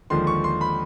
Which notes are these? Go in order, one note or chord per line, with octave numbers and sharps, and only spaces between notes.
D#2 D3 F3 G#3 C6
C#6
C6
B5